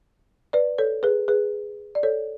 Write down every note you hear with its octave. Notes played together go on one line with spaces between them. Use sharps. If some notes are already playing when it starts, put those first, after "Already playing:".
B4 D5
A4 C#5
G#4 B4
G#4 B4
D5
A4 C#5